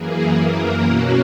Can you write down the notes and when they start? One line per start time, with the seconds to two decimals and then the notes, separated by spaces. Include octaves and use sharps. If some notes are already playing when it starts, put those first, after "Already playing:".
Already playing: F#2 E3 A#3 G#4
0.38 A#4
0.84 B2 F#3 A#3 C#4 F#4